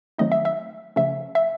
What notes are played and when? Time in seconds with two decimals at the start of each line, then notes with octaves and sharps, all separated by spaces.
0.18 D#3 F#3 A3 C4 D#4 D#5
0.32 E5
0.45 E5
0.96 C#3 F3 A3 C#4 E5
1.35 E5